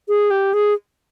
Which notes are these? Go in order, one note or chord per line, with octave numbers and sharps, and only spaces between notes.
G#4
G4
G#4